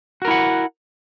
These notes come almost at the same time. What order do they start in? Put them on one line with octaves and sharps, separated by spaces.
F#4 A#4 E4 F#5